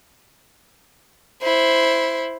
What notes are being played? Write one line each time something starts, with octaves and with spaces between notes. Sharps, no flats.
E4 C5